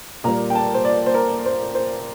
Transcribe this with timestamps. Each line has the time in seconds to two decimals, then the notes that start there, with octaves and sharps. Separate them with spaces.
0.24 A#2 G3 A#3 A#5
0.50 G5
0.55 A5
0.74 C5
0.85 D5
1.06 C5
1.14 A#4
1.46 C5
1.75 C5